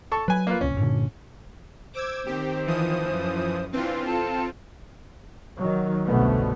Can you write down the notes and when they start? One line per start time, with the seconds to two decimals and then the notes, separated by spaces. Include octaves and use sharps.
0.12 A4 A5 C#6
0.28 F#3 B4 G#5
0.47 A#3 F4 B4
0.61 D1 C2 C#4
0.78 G2 A#2 D3
1.95 C5 D6 E6 G#6
2.26 D#3 C4 G4
2.67 E3 F3 D#6
3.08 F#2
3.73 E3 C4 D4 F4 B4
4.06 A4 A5
5.57 D#3 F#3
6.07 G1 C2 B2 D3 A3 B3